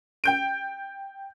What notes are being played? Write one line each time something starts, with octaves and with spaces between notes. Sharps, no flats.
G5 G6 D7